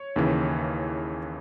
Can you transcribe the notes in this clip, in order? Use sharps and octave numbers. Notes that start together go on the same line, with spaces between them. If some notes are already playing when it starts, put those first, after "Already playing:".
Already playing: C#5
D#2 C#3 E3